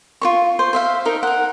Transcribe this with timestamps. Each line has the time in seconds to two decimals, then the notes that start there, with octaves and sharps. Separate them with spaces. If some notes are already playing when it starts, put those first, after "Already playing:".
0.22 F4 C5 C#6
0.59 C5
0.73 C5 E5 F5
1.05 D#4 A#4 D#5
1.23 A#4 F#5